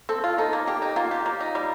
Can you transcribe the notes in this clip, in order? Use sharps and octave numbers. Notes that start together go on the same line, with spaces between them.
C4 A4
F4
D#4 A4
A#3
A#3 G4
D#4
A#3 F4
G4
A#3
D#4
G3